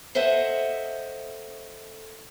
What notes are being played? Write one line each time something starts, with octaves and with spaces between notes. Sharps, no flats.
A4 C5 D#5 E5 F#5